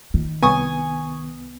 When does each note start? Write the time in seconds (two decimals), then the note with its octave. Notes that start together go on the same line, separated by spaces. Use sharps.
0.14 D#3
0.43 C2 B3 G#5 C#6 D#6